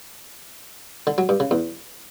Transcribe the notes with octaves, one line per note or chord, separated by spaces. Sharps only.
D3
F#3
G2
C#3
E2